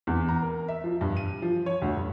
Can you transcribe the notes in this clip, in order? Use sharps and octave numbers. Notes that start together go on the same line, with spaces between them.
E2
A#5
A#4
E5
F3
G2
D#7
F3
C#5
D2
G2